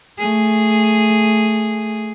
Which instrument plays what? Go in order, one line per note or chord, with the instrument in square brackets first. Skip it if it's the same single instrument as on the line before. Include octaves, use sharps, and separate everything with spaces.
[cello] A3 G#4